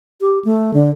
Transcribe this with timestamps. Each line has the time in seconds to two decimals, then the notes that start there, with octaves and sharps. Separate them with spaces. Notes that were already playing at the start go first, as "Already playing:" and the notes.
0.21 G4
0.45 A3
0.74 D3